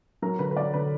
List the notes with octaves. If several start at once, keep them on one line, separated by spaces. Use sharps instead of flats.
F#3 A#4
D3 B4
B4
F#3 D5
D3 B4